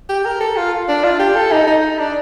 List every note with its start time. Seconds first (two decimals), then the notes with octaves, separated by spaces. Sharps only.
0.09 G4
0.25 A#4
0.40 A4
0.57 F4
0.88 D4
1.04 F4
1.19 G4
1.35 A4
1.52 D#4
1.67 D#4
1.98 D4